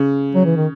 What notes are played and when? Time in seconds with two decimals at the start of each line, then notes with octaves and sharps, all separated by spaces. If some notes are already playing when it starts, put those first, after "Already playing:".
Already playing: C#3
0.35 F#3
0.45 E3
0.56 D#3